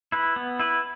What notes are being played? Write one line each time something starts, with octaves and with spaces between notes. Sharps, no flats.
E4 B4
B3
E4 B4